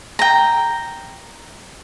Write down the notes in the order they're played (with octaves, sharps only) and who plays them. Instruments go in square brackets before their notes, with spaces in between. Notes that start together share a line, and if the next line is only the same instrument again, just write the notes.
[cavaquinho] G5 A#5